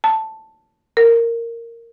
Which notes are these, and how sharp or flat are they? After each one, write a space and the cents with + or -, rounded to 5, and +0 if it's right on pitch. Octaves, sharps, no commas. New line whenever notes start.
A5 +0
A#4 -10